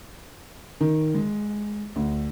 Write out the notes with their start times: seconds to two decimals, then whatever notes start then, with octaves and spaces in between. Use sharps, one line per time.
0.81 D#3
1.14 G#3
1.96 D2